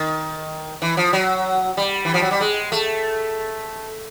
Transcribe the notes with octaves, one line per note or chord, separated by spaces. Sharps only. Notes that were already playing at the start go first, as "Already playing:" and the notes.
Already playing: D#3
E3
F3
F#3
G3
E3
F3
F#3
G3
G#3
A3